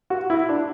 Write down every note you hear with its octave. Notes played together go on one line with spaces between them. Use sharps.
F#4
E4
D4